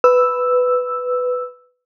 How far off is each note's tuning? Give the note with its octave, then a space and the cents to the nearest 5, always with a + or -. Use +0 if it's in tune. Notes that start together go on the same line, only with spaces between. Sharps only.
B4 +10 E6 +0